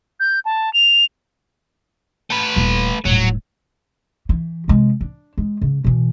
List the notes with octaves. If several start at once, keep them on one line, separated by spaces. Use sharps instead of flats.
G6
A5
F7
A3 B4
D#1 A#3
D#1 A2 F#3
E3
C3 G#3
D4
G#3
C#3
B2 E3